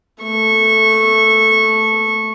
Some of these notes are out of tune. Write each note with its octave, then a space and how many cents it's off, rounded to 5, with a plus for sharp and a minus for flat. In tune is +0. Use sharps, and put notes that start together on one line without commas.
A3 +0 C#6 -15